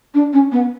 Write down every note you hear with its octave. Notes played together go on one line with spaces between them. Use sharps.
D4
C#4
B3